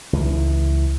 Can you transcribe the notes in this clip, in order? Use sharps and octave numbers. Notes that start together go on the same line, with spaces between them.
C#2 E3